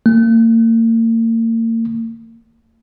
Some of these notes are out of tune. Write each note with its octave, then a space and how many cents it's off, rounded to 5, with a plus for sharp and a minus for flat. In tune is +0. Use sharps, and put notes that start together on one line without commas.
A#3 -40